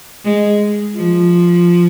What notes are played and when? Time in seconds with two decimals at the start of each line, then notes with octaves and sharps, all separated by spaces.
0.24 G#3
0.95 F3